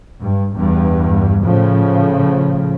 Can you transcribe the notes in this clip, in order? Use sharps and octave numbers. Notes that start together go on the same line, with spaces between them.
G2
E2 G2
A2 C#3 F3